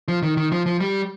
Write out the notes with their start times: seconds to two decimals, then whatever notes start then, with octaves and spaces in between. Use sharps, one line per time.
0.08 F3
0.22 D#3
0.37 D#3
0.52 F3
0.66 F3
0.80 G3